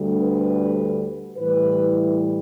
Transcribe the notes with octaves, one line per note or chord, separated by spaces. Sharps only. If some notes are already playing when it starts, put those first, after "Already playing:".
Already playing: D2 D3 G3
B4
A2 E3 G3 B4